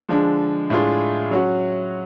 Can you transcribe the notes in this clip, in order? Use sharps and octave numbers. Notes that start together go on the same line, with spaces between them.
D3 F3 G#3 D4
A2 G#3 D4 F4 G#4
F#3 C#4 F#4